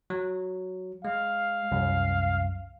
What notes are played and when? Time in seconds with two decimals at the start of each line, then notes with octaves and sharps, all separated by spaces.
0.10 F#3
1.05 G#3 F5
1.72 C2 F#2